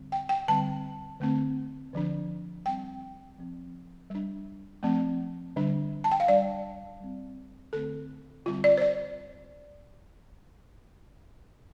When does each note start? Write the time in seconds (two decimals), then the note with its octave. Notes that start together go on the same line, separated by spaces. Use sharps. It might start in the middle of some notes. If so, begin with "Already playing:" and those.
Already playing: D3 G3 C4
0.12 G5
0.29 G5
0.48 D3 G3 C4 A5
1.20 D3 A3 C4
1.93 D3 F3 D4
2.66 G3 C4 G5
3.38 F3 C4
4.10 G3 D4
4.83 F3 A3 C4
5.56 D3 G3 D4
6.04 A5
6.12 G5
6.20 F5
6.28 G3 D4 D5
7.00 G3 C4
7.73 D3 A3 C4 A4
8.45 D3 G3 C4 F4
8.64 D5
8.77 C5
8.82 D5